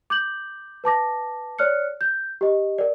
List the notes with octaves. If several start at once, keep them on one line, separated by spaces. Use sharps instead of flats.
D6 G6 F#7
B4 A5 D6 A#6
C#5 D5 F6 F#6 C#7
G6
G4 D#5
A#4 D5